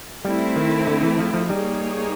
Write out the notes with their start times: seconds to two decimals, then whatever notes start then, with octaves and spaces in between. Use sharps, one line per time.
0.24 G3 A3 C4 E4
0.56 D#3
0.87 D3
1.03 E3
1.19 F3
1.34 F3
1.49 G3 A#3 D#4 G#4 C#5